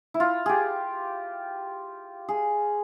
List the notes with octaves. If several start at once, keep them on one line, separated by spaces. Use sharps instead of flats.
E4
F4
G4 G#4
G#4